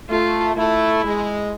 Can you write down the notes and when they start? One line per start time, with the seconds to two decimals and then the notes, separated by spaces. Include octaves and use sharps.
0.09 A3 F4
0.56 A3 E4
1.04 G#3